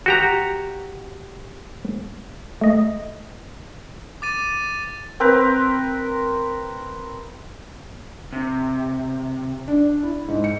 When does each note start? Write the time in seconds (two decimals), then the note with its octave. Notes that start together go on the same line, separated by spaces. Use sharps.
0.06 F#4 G4 A#5
2.61 A3 D#5
4.22 D6 A6 D#7
5.20 C4 A#4 B4
8.32 C3
9.68 D4
10.03 E4
10.28 G#2
10.44 C#7